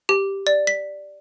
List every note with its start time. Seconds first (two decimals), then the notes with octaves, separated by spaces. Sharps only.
0.09 G4
0.47 D5
0.67 B6